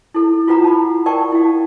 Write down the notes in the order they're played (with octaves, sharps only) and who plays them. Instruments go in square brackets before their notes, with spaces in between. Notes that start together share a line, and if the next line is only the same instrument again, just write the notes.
[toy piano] E4 A4
E4 F4 A4 B4 F#5 A#5
A5 B5
A#4 D5 F#5 G5 A5 C#6
E4 F5